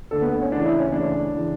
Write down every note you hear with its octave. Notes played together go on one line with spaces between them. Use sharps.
D2 D3 A4
B3
C#4
D2 C#3 E3 D4
E4
C#4
D2 C#3 E3 D4
C#3 E3